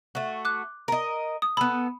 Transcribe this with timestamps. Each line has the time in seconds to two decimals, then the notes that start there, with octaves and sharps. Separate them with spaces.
0.15 A3 F#4
0.45 D6 F#6
0.88 A#4 D#5
1.42 D#6
1.57 B3 A4 B5